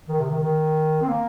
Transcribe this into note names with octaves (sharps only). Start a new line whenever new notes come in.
D#3
C3
D#3
D#3
C4
A#3